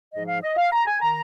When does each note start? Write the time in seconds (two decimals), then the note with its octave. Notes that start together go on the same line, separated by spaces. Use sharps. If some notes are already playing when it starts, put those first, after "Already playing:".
0.14 G#2 F3 D#5
0.28 F5
0.42 D#5
0.57 F5
0.72 A#5
0.87 G#5
1.01 D#3 A#5